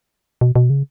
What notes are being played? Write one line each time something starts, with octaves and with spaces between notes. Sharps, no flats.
B2
B2
C#3